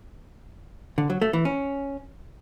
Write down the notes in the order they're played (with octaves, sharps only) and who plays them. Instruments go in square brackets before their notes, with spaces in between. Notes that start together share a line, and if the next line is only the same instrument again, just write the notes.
[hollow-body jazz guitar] D3
F#3
A3
E3
C#4